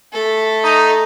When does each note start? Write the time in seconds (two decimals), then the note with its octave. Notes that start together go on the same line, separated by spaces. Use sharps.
0.12 A3 A4
0.64 D#4